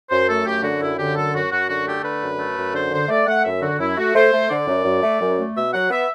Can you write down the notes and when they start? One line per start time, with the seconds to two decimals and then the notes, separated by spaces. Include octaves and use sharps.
0.10 F#2 C5
0.28 A3 A4
0.45 F#2 G4
0.63 D3 F#4
0.80 F#2 E4
0.98 D3 G4
1.16 F#2 A4
1.34 F#2 F#4
1.51 F#2 F#4
1.69 D3 F#4
1.86 A3 G4
2.04 D3 B4
2.22 F#2
2.39 A3
2.57 F#2
2.74 D3 C5
2.91 D3 C5
3.09 A3 D5
3.26 A3 F#5
3.44 F#2 E5
3.61 D3 F#4
3.80 F#2 E4
3.97 A3 F#4
4.14 A3 C5
4.33 A3
4.50 D3 D5
4.67 F#2
4.85 F#2
5.03 A3
5.21 F#2
5.38 A3
5.55 B2 E5
5.73 F#3 F#5
5.90 B3 E5